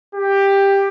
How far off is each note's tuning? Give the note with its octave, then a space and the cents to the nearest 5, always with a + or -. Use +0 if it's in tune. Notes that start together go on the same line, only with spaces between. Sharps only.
G4 +10